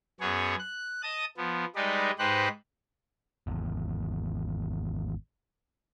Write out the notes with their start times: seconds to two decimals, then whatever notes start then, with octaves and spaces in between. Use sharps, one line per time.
0.20 F#2 B3 G#4 C#5
0.59 F#6
1.03 D#5 A5 D#6
1.37 F3 B3
1.76 G3 G#3 D#4 B4 D5
2.19 G#2 D#4 G4 B4 C5 F#6
3.47 G#1 E2